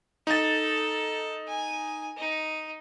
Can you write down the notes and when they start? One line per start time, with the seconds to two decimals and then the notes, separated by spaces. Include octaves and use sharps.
0.27 D#4 A4 A6
1.47 G#5
2.17 D#4